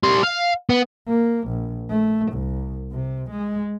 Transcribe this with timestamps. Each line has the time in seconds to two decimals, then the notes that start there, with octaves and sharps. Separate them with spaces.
0.03 G3 C6
0.23 F5
0.70 B3
1.08 A#3
1.48 A#1
1.90 A3
2.33 C2
2.92 C3
3.31 G#3